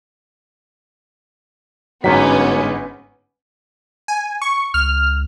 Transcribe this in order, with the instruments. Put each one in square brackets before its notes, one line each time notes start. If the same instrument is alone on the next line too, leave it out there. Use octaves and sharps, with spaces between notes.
[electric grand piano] G1 G#2 B6 [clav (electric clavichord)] F#3 [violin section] B3 C#4
[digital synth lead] G#5
C#6
[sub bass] C#2 [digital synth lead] F6